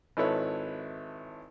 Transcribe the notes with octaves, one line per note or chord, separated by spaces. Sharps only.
G#1 E4 A4 B4 C#5